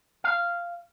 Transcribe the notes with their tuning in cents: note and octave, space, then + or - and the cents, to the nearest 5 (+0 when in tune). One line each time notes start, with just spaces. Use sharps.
F5 -10